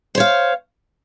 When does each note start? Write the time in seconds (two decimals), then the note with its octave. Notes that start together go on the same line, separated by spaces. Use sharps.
0.15 C5
0.17 C#5
0.20 F5